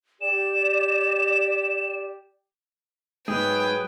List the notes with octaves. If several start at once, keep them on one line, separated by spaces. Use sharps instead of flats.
G4 D5 E7
G#2 F#3 G#4 B4 G5